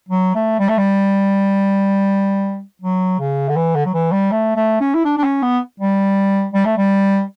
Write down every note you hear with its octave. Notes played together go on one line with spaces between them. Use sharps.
F#3
A3
G3
A3
G3
F#3
C#3
D3
E3
D3
F#3
E3
G3
A3
A3
C#4
E4
D4
D4
C#4
B3
G3
G3
A3
G3